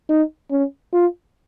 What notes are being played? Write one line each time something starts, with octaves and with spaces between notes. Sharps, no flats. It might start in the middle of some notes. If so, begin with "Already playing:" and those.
D#4
C#4
F4